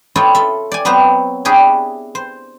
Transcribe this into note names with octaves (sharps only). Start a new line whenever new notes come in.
E4 F4 A4 C#5 D#5 G5
F4 A4 E5
D5 G#5
F#3 B3 C4 B4 C5 A#5
D4 E4 G4 G#4 C#5
C5